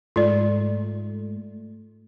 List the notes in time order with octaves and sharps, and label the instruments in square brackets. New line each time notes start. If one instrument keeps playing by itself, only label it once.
[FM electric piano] G#2 A3 [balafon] F4 D5